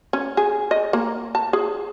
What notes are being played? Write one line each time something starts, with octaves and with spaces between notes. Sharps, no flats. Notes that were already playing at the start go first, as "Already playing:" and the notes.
C#4
G#4
D#5
A#3
A5
G#4